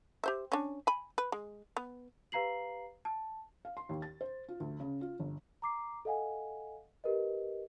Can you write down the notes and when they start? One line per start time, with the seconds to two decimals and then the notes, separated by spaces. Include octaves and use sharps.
0.24 G4 C5 E5
0.52 C#4 D4
0.87 G#5 B5
1.18 B4
1.32 G#3
1.77 B3
2.32 G4 B4 F5 A#5 C7 F#7
3.05 A5
3.65 F5
3.77 C6
3.89 D#2
4.02 A6
4.21 C5
4.49 F4
4.60 D2
4.80 C#3
5.01 F4
5.19 G1
5.62 A#5 D6 C7
6.05 A4 D#5 F5 F#5 G#5
7.04 G4 A#4 B4 D#5